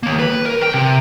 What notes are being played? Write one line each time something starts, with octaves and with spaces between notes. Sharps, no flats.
D#3 A#3
B4
A#4
G5
C3